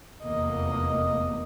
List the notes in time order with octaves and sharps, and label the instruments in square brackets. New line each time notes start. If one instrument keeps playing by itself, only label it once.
[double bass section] F1 E2 A#3 [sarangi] D#5